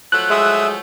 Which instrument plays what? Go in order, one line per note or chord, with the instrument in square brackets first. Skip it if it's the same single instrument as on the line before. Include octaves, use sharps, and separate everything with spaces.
[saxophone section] F3 F#3 A3 [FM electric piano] F#6
[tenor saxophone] G#3 [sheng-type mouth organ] E5 D#6 E6